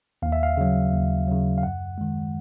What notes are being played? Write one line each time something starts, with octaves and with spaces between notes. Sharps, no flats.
D#2 F5
E5
F5
C#3 F#3
D#2
C#3 F#3
F5
F#2 F#5
D#3 G#3